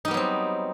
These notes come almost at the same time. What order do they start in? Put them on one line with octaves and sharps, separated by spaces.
D#4 G3 B3 F#3 C4